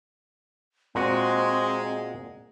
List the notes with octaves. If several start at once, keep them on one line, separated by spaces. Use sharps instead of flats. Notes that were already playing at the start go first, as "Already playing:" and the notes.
A#2 G#3 C4 F#4